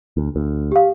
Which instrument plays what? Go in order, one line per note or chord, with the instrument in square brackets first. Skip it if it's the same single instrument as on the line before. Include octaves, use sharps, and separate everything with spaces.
[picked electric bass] D2
D2
[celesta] G4 F5